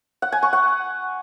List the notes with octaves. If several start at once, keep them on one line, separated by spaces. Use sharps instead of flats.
F#5
G#5
C#6
F#5